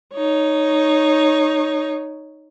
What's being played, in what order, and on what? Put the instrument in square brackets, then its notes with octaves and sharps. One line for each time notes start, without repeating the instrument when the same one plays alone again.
[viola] D#4 C#5